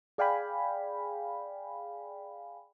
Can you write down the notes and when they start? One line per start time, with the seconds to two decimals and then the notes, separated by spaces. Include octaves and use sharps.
0.18 G#4 D5 F5 G5 G#5 B5